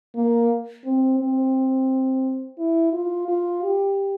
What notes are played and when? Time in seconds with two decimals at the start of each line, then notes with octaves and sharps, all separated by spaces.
0.16 A#3
0.85 C4
1.19 C4
2.59 E4
2.93 F4
3.28 F4
3.63 G4